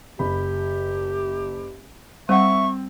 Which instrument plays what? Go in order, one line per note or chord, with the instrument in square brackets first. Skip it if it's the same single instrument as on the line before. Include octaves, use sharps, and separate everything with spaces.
[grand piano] F#1 B5 [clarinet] G4
[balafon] G3 F#5 [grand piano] C4 [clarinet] E5 [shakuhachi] C#6